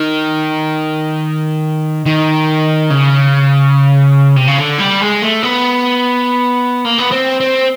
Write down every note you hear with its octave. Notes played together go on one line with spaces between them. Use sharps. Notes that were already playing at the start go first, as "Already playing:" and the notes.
Already playing: D#3
D#3
C#3
C3
C#3
D3
G3
G#3
A3
B3
A#3
B3
C4
C4